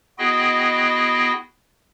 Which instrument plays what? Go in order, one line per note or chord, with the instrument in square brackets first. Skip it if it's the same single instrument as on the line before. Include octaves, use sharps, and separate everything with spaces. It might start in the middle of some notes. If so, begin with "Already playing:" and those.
[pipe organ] B3 E4 F#4 G#4 D#5 G5